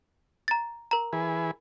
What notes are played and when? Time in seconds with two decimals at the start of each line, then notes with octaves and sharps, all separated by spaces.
0.48 A#5 A6
0.91 A#4 A#5
1.13 E3 G#4 B4